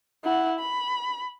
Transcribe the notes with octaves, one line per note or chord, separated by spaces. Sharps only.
E4 F#5
B5